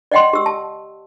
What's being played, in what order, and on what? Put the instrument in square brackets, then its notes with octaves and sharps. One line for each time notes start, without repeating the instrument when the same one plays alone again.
[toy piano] D5 D#5 F#5 G5 C6
G4 E6
A5